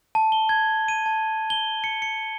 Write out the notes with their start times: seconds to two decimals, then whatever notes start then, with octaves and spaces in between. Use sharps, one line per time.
0.15 A5
0.32 G7
0.49 G#6
0.88 D#7
1.06 A5
1.50 G7
1.84 C#7
2.02 C#7